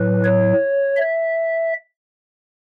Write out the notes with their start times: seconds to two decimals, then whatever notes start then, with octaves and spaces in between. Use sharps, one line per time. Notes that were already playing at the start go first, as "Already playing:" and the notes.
Already playing: A2 F#3 B4
0.24 C#5
0.97 E5